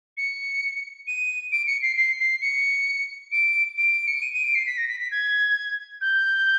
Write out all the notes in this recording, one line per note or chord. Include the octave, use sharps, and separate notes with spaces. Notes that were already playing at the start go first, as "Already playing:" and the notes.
C#7
D#7
D7
C#7
C7
C7
C7
C#7
D7
D7
C#7
D7
D#7
D#7
D7
C7
B6
A#6
B6
B6
G#6
G6